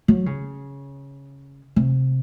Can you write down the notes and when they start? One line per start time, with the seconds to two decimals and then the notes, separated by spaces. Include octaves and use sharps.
0.08 F#3
0.26 C#3
1.76 C3